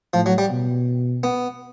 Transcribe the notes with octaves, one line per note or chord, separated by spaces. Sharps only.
A2 F3
F#3
G3
B2
B3